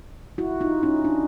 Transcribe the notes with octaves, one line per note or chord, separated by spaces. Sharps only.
E4 F#4
D#4 F4
C#4 D#4
D4